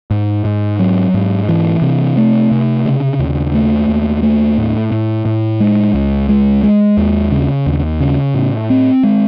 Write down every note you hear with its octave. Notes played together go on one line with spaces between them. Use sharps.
G#2
G#2
F#3
G#2
E3
C3
A3
C3
C#3
D#2
A3
D#2
A3
A2
A2
A2
G#3
C#2
G#3
G#3
D#2
C#3
D#2
C#3
A2
C4
G#3